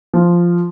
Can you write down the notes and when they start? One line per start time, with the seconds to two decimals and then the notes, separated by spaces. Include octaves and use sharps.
0.14 F3